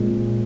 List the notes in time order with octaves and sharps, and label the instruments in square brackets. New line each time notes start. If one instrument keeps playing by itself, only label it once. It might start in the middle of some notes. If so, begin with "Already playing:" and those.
Already playing: [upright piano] A#2 G#3 C4